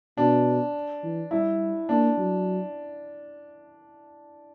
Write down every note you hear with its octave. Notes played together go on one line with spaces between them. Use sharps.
B2 D4
E3
G3 E4
A#3 D4
F#3